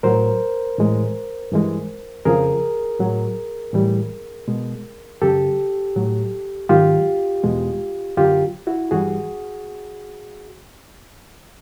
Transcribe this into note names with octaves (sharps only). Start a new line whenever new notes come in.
A2 F#3 A#4 C5
A2 E3 G#3
G2 E3 G#3
F2 C#3 F3 G#4 A#4
A2 F#3
A2 E3 G3
B2 G#3
F#2 C#3 F#3 G4 A4
A2 F#3
G#2 D#3 F#3 F4 G4
E2 B2 G#3
F#2 D3 F#3 F4 G4
E4 F#4
G2 E3 G3 F#4 G#4